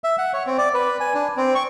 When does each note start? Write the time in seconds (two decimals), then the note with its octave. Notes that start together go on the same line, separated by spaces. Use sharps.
0.04 E5
0.18 F#5
0.33 C#5
0.46 C4
0.58 D5
0.74 B4
1.00 G#5
1.14 D4
1.37 C4
1.55 C#6